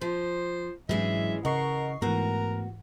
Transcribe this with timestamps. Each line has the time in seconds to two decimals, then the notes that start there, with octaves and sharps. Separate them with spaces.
0.01 F3 C5
0.89 G#2 E3 F#3 G#3 C#4 D4 E5
1.45 C#3 A#4 D#5 F#5 C#6 C7
2.02 G#2 E3 A3 B3 F#4 A#4